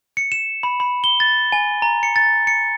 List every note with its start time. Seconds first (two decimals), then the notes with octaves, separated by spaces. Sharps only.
0.17 C#7
0.32 E7
0.63 B5
0.80 B5
1.04 G7
1.20 A6
1.52 G#5
1.82 A#5
2.03 C#7
2.16 A6
2.47 C#7